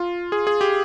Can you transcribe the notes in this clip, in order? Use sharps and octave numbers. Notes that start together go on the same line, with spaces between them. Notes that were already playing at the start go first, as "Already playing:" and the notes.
Already playing: F4
G#4
G#4
G4